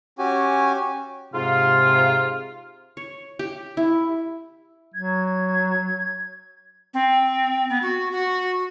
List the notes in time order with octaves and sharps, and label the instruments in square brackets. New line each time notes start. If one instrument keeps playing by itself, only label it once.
[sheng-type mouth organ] C#4 F#4 G4 G#5
[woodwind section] G#2 F4 [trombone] C3
[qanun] C#5
G4
E4
[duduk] F#3 [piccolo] G#6
[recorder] C4
B3
F#4
F#4